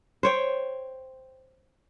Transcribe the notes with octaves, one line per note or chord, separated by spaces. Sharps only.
C5 C#5 G5